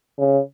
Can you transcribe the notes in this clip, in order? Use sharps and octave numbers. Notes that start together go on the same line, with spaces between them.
C#3